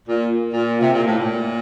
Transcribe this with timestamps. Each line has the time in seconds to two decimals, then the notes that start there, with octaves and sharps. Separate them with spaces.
0.08 A#2
0.54 A#2
0.81 C3
0.94 A#2
1.05 A2
1.18 A#2